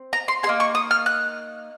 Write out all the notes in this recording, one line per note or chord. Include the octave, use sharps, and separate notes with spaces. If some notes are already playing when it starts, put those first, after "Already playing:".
Already playing: C4
A#5
C6
G#4 C6
A#3 D#4
C#6
D#6
F6
F#6